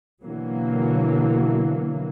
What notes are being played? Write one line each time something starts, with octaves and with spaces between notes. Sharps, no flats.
B2 D3 E3 F#3 A#3